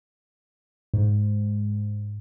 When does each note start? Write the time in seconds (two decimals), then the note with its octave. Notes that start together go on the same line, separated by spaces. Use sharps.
0.94 G#2